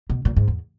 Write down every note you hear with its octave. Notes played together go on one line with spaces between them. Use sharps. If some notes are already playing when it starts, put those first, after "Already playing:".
B2
A#2
G#2
E2